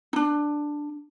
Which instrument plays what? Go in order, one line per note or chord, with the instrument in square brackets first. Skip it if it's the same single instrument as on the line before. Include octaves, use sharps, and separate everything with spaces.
[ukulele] D4 D#4